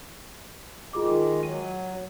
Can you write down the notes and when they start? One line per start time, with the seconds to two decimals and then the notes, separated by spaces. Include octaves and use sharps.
0.93 D#3 G#3 F4 G#4 D6
1.43 F#3 D#7